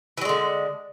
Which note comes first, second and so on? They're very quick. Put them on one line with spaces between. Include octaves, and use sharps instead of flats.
E3 F#3 G#3 D3